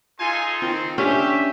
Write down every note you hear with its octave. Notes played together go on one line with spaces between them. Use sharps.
D#4 F4 A4 G#5 C6
D#3 C4 F4
C#4 D4 G4 E5 D6